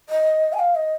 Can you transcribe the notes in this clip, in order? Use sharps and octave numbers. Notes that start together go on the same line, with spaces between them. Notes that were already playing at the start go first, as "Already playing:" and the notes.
D#5
G#5
F5
D#5